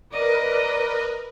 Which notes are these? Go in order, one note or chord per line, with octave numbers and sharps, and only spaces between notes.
A#4 B4 D5 D#5